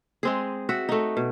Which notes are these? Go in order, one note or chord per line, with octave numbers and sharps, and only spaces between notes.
G#3 C4 G#4
F#4 E5
A3 D#4
B2